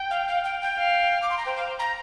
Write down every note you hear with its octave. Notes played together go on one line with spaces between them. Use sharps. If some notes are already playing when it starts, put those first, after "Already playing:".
Already playing: G5
F5
F5
G5
G5
F5
D6
C6
A#5
C5 G5
F5
A#5